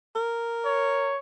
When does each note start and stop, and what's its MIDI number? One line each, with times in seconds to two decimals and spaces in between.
0.15 1.13 70
0.65 1.19 73